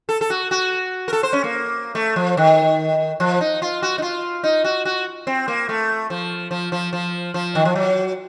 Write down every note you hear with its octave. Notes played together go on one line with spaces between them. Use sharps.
A4
A4
F#4
F#4
A#4
A4
C5
C#4
A#3
A3
F3
D#3
F3
D#4
F4
F#4
D#4
F4
D#4
F#4
F#4
C4
A#3
A3
F3
F3
F3
F3
F3
D#3
F3
F#3